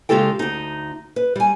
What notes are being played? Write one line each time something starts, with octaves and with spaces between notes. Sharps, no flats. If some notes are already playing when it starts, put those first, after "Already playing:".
C#3 G#3 F4 G4 A4 G5
D2 D#4
B4
G3 G#5